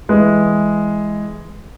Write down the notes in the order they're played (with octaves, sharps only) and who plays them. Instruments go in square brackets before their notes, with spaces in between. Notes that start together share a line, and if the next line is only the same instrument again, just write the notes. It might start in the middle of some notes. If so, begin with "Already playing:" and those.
[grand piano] E3 G#3